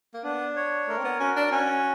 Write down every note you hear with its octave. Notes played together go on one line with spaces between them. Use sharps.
A#3
B3 D4
C#5
A3 A#4
C4
B3
C#4 F#4
D4
C#4 F#4